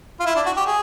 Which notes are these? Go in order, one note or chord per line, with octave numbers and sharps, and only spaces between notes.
F4
E4
D4
F#4
G4
G#4